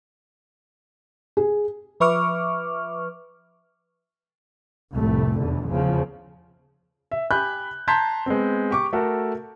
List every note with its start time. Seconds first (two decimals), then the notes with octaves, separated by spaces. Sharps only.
1.37 G#4
2.00 F3 B4 E5 C#6 D6 F6
4.94 F1 C2 A2 A3
5.40 E2 B2 D3
5.71 E2 C#3 F3
7.12 E5
7.31 G4 G#5 B5 F#6 G6
7.88 A5 A#5 C6 G6 G#6 B6
8.26 G#3 B3 C4
8.71 G4 C#6 D6
8.93 A3 F#4 A4 A#4